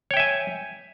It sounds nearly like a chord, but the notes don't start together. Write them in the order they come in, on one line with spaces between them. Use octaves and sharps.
C#5 G5 E5 G#5